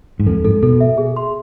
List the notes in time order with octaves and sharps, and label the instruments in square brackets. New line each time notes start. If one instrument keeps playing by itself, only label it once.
[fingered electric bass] G#2
[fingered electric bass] F2 [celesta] A4
[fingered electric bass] G#2 [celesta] A4
[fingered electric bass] B2 [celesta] A4
[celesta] E5
G#4
C6